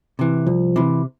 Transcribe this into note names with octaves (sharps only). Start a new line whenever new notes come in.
C3 E3
C2 F3
C3 E3